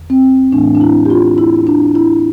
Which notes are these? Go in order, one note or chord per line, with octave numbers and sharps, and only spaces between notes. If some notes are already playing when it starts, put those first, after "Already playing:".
Already playing: E2 D3
C4
A2 E3 A3 D4
D4
E4
G4
F4
E4
D4
E4